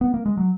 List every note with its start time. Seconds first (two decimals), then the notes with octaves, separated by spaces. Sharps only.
0.01 B3
0.14 A#3
0.26 G#3
0.37 F#3